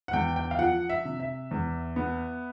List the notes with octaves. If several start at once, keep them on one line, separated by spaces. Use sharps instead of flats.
F#5
E2 G5
G5
F5
F3 F#5
E5
C3
E5
E2
B3